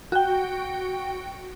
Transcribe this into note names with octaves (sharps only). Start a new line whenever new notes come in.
F#4 G5